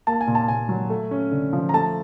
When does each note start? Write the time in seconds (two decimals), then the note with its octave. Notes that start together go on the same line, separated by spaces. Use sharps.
0.07 A#3 A5
0.21 G#5
0.27 A#2
0.35 A5
0.48 A#2 G#5
0.69 F#3
0.90 A3
1.11 C#4
1.31 D3
1.53 F3
1.69 A#5
1.74 A3 A5